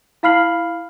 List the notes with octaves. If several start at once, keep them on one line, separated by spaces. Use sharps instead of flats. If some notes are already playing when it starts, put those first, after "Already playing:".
E4 F5 B5 F6 C7 F#7